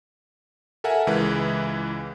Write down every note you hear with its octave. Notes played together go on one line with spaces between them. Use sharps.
A4 A#4 E5 F#5 G#5
C#2 E3 G#3 B4